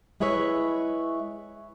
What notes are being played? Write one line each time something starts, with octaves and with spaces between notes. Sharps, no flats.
G#3 E4 G#4 B4 C#5 E5